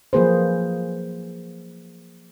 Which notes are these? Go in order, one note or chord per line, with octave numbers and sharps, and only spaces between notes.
F3 F#3 A#3 G#4 B4 C5